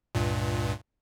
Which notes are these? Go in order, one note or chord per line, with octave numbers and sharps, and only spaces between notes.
C#2 G2 A#2